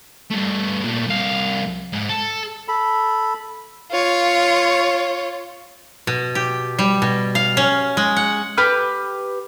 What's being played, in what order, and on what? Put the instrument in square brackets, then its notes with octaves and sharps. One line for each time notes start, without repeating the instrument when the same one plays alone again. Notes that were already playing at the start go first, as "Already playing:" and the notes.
[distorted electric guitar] G2 A3
A#2 A3
C2 F5
G#2
A4
[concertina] A4 B5
[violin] F4 C#5
[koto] B2
G4
G3
B2
F5
C#4
G#3
F#5
[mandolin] G4 B4 F6